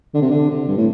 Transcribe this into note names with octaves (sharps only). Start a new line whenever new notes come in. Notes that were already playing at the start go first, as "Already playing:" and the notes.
D3
C3
D3
C3
G2
A2